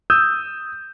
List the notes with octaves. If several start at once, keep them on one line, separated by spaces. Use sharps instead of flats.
D#6 E6 G6